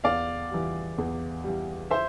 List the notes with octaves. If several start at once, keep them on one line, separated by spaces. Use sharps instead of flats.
E2 D5 F5
E3 G3
E2
E3 G3
C5 E5